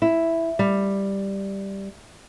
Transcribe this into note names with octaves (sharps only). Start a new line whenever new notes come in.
E4
G3